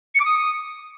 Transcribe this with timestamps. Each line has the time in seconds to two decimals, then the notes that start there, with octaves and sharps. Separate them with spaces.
0.14 C#7
0.19 D6
0.25 D#6